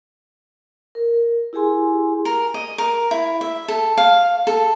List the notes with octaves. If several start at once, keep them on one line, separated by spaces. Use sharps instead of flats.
A#4
E4 G4 G#4 G#5 C6
A#4
D#5
A#4
E4
E5
A4
F5
A4